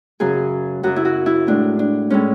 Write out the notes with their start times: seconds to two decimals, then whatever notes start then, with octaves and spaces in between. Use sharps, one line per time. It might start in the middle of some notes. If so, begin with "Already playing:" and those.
0.20 F#2 C#3 F#3 G#4
0.83 F#2 C#3 F#3 F#4
0.96 E4
1.05 F#4
1.26 E4
1.47 A2 G#3 D4
1.79 D4
2.10 A2 G#3 C#4